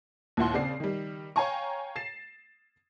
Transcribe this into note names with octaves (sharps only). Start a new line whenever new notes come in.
D#2 A#2 E4 F#5 C6
C#3 C4 D5 C7
D#3 G3
C#5 F5 G5 G#5 A#5 C#6
A6 C7 E7